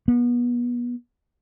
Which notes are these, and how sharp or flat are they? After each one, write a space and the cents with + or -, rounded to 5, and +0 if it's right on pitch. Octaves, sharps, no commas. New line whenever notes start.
B3 -30